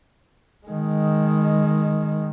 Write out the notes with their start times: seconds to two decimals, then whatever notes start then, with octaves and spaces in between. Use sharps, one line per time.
0.67 D#3 G#3